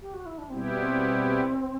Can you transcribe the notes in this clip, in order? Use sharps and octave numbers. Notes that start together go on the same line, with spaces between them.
G4
F#4
E4
D4
B2 G3 B3 C4 E4 G4
C4